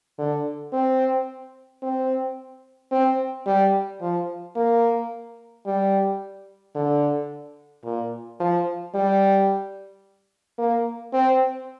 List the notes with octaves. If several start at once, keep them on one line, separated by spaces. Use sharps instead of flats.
D3
C4
C4
C4
G3
F3
A#3
G3
D3
A#2
F3
G3
A#3
C4